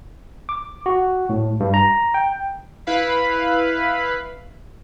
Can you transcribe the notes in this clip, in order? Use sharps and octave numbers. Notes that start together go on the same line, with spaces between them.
D6
F#4
A2
G2
A#5
G5
E4 B4 F5 B5